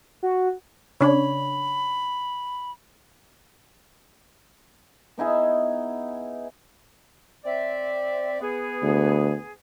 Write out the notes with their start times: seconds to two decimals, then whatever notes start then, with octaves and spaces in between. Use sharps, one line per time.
0.23 F#4
1.01 C#3 D4 C#5 B5
5.18 B3 D#4 E4 G#4
7.45 C4 D5 E5
8.41 B3 G#4
8.82 D2